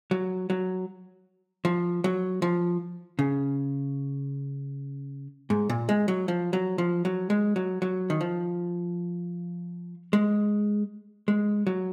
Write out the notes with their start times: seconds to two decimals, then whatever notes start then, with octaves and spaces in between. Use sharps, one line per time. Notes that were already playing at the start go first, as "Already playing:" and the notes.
0.11 F#3
0.50 F#3
1.65 F3
2.04 F#3
2.42 F3
3.19 C#3
5.50 G#2
5.70 A#2
5.89 G#3
6.08 F#3
6.28 F3
6.53 F#3
6.78 F3
7.05 F#3
7.30 G#3
7.56 F#3
7.82 F#3
8.10 D#3
8.21 F3
10.13 G#3
11.28 G#3
11.67 F#3